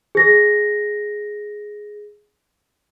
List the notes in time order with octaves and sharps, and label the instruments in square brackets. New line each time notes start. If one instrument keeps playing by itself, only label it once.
[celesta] G#4 A#6